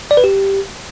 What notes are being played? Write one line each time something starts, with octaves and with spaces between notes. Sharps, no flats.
D5
B4
G4